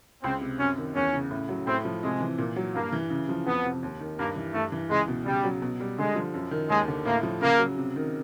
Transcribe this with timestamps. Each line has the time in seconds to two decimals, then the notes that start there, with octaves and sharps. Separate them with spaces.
0.23 C#2 C4
0.41 C3
0.59 F#2 C#4
0.78 D#3
0.95 E2 C#4
1.13 C#3
1.31 A2
1.49 F#3
1.67 A2 C4
1.85 F3
2.02 C3 G#3
2.20 E3
2.38 A#2
2.56 F#3
2.75 G2 A#3
2.92 E3
3.10 C#3
3.29 F3
3.46 F2 B3
3.65 C3
3.83 D#2
4.01 D#3
4.18 G2 A#3
4.36 E3
4.54 G2 A3
4.72 E3
4.91 C#2 G#3
5.08 B2
5.26 C#3 G3
5.44 F#3
5.62 B2
5.80 G3
5.98 D3 G#3
6.15 F3
6.34 F#2
6.51 D#3
6.70 D#2 G#3
6.88 D3
7.05 A2 A#3
7.23 F3
7.42 C#3 A#3
7.59 F#3
7.77 C3
7.96 D#3